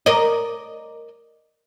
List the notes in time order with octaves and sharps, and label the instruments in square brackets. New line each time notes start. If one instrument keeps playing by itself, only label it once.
[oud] A#4 D5 D#5